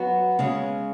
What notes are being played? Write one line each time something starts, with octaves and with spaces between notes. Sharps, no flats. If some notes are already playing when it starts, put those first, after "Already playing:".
Already playing: F#3 B3 F#4
C#3 G#3 C#4